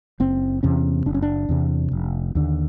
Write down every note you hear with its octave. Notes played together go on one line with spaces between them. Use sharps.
F#1 C4
E2 C3 C#4
F#1 D4
C#4
D4
E2 C3
F1
D#2 D3